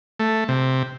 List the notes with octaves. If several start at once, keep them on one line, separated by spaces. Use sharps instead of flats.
A3
C3